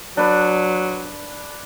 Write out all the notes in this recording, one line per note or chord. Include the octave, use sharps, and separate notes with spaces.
F#3 D4 B4